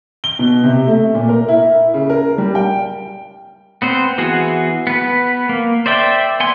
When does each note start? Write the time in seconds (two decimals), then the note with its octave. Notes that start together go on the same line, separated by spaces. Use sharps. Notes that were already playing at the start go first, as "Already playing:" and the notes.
0.24 G7
0.39 B2
0.64 C3
0.88 A3
1.15 A#2
1.29 A#4
1.49 E4
1.94 C#3
2.10 A#4
2.38 G3
2.55 G5
3.82 B3 C4 C5
4.18 E3 B3 F#4 G#4
4.87 B3 B4
5.49 A#3
5.86 C5 D5 E5 G5
6.40 B3 G#5 C6